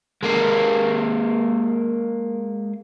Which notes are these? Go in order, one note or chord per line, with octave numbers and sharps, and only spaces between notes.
G#3 A#3